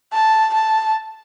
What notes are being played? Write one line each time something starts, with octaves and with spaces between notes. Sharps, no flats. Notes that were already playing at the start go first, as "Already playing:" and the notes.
A5
A5